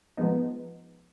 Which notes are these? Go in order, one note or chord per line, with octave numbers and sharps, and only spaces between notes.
F3 G#3 B3 D#4